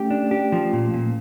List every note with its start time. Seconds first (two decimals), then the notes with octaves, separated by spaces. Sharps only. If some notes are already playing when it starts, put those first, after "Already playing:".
Already playing: A3 C#4 G4
0.10 D4
0.31 G4
0.52 F3
0.73 A#2
0.94 A#2